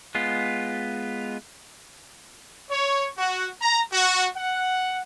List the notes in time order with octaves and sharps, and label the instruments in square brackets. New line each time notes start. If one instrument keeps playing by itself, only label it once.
[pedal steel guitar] G#3 B3 F4
[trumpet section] C#5
F#4
A#5
F#4
F#5